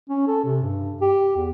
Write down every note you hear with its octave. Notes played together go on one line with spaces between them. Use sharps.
C#4
A4
C3
G2
G4
E2